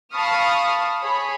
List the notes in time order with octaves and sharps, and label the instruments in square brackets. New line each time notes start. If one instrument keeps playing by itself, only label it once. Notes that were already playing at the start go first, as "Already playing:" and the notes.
[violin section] F5 A5 B5 C#6 D#6 F6
G#4 C#5 B5